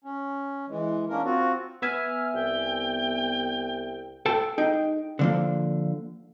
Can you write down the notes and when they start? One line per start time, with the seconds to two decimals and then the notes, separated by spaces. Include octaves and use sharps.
0.04 C#4
0.69 E3 G#3
1.09 A#3 C#4 D4 A#4
1.24 C4 F4 F#4
1.82 B3 E5 G#5 F6
2.34 C2 G5
4.26 A4 G5 A5
4.58 D#4 G#4 G5
5.19 D3 F3 A#3